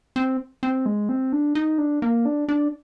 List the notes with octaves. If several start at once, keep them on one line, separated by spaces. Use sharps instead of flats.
C4
C4
G#3
C4
D4
D#4
D4
A#3
D4
D4